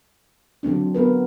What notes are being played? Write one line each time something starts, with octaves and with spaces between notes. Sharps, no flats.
D3 F#3 C4 D4
B3 A#4 B4